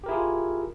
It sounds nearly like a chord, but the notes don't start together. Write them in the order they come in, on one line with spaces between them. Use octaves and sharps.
G4 A#4 E4 G#4 F4